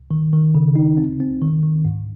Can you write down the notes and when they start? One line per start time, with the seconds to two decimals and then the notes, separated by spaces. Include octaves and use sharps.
0.11 D#3
0.33 D#3
0.55 C#3
0.76 D#4
0.97 C4
1.20 C4
1.42 D#3
1.63 D#3
1.85 G#2